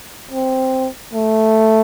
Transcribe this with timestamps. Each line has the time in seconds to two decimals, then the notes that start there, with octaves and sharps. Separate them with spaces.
0.31 C4
1.14 A3